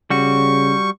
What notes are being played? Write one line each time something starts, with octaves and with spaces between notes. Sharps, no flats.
C#3 G3 F#4 C#6